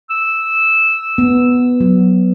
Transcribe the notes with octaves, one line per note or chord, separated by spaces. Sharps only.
E6
B3
F#3